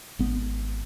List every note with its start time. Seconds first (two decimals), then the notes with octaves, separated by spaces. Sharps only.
0.19 G#1 B3